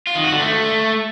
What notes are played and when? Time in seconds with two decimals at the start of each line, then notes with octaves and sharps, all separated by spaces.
0.07 F4
0.15 D#3
0.24 F#4
0.32 D3
0.40 A3